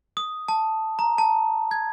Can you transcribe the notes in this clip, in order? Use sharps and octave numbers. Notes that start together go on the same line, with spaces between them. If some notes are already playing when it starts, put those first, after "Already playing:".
D#6
A5
A#5
A5
G#6